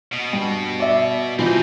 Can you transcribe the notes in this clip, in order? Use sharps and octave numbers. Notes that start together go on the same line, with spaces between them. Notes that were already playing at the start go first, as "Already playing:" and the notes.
B2
G2
D5 E5
B2 E3 F3 C4 D#4